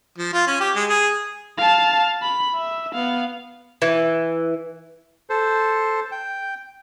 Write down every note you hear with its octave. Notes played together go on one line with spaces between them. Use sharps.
F3
F4
C#4
G4
G#3
G#4
F5 A5
B5
E5
B3 F5
E3
A4 C5
G5